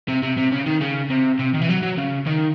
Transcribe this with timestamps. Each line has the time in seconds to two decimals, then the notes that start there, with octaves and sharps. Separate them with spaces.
0.08 C3
0.23 C3
0.38 C3
0.52 C#3
0.66 D#3
0.81 C#3
1.10 C3
1.39 C3
1.54 D#3
1.61 E3
1.69 F#3
1.83 F#3
1.98 C#3
2.26 D#3